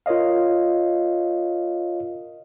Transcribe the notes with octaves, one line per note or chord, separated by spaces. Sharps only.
F4 A#4 C#5 D#5 F5